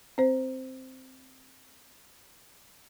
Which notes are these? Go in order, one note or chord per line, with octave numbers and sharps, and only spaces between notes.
C4 C5